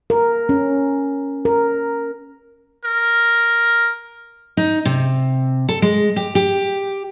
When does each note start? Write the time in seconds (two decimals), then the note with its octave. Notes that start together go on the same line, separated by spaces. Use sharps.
0.10 A#4
0.49 C#4
1.45 A#4
2.85 A#4
4.57 D#4
4.85 C3
5.69 A4
5.82 G#3
6.16 G4
6.35 G4